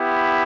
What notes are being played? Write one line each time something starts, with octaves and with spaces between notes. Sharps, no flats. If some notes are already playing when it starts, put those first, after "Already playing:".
Already playing: B3 E4 G4